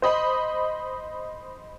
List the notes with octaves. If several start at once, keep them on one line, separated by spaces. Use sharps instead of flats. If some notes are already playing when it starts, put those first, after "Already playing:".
C5 D#5 B5